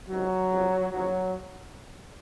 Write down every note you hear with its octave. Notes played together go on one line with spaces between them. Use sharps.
C#2 C3 D#3 F#3
C#2 C3 F3
D#2 C#3 F3 F#3